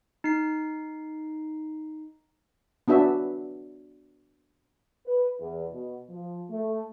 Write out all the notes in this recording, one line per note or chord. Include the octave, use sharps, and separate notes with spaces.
D#4 C7
B3 D4 F#4 E5
B4
E2
B2
F3
A3